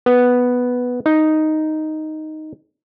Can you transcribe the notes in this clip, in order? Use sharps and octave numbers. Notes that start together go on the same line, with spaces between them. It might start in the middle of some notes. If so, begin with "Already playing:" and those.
B3
D#4